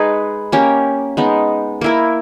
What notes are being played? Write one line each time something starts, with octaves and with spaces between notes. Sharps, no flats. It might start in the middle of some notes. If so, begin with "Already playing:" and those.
Already playing: G#3 D#4 G#4 B4
A#3 C#4 G4
G#3 B3 D#4
A#3 E4 A#4